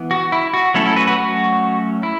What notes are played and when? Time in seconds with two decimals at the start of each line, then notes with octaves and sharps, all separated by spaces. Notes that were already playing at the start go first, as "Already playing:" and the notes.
Already playing: E3 B3
0.11 F#4
0.32 E4
0.54 F#4
0.74 F#3 A3 C#4 E4 A4
0.85 E4 A4
0.96 F#4 B4
1.07 F#4 B4
1.18 F#4
2.03 E4